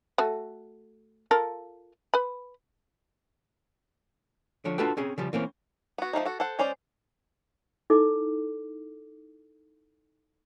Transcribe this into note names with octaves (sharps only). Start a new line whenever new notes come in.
A3 F#4 A4
F4 A4 A#4
B4 B5
D3 F3 C#5
D4 F4 F#4 A4 B4 G5
C4 C#4 G#4
C#3 F3 G3
E3 A#3 C4 C#4
B3 F#4
F3 G3 A3 D#4
F#4 A4
A4 C5 F#5
G#3 C#4 C5 D5
D#4 E4 A4 D6